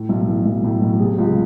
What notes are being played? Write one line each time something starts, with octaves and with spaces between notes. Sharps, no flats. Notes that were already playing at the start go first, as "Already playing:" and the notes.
Already playing: A2 A4
B1
E3
B1
A2
B1
C3 G#4
C#2
G#4